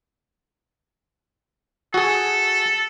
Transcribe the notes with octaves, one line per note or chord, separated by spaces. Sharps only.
F#4 G#4 A4